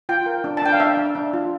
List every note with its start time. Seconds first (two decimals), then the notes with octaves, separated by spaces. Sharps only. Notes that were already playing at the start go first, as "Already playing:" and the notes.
0.09 F4 G5
0.26 A#4
0.44 D4
0.57 A5
0.62 D4 G5
0.72 F5
0.80 D4 E5
0.97 D4
1.15 D4
1.33 F4